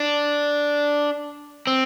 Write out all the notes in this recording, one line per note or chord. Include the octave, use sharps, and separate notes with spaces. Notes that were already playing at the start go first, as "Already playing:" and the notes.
Already playing: D4
C4